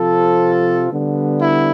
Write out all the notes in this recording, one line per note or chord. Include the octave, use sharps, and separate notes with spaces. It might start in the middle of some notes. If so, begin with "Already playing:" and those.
Already playing: C3 F3 C4 F4 A4
D3 G3 B3
E4